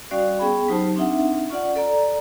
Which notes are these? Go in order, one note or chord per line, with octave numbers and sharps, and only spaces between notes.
G3 C#4 F#4 D5 F5
B3 C#4 G#4 G5 B5
F#3 D#4 G4 C5 A5
C4 D4 D#4 E5 F#5
C#4 F4 D5 F#5
A4 D5 A#5